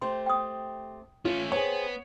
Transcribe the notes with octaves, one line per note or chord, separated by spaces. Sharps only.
A3 C4 G4 C6
G5 D#6
A3 C#4 F4
B3 C4 G#4 C#5